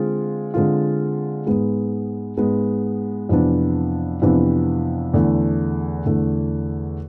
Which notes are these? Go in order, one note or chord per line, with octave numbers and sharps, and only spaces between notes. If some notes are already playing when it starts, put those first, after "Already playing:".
Already playing: D3 G#3 C4 F4
D3 G#3 C4 F4
G#2 G#3 B3
G#2 G#3 B3
F2 C3 E3 B3 D4
F2 C3 E3 B3 D4
E2 D3 A3
E2 D3 A3